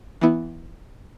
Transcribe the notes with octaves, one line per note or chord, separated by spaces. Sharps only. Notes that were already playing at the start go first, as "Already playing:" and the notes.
E3 B3 E4